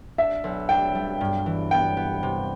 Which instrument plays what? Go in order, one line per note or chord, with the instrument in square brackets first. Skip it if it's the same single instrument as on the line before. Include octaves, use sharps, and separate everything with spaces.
[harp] D4 [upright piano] E5
[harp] B1
[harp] D4 [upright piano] G5
[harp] G3
G2
E3
[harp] B3 [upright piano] G5
[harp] B3
C3